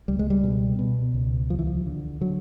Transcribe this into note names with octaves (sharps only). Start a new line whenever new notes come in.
C#2 G3
G#3
G3
B2
B2
C#2
D#2 F3
E3
F3
D3
D3 F#3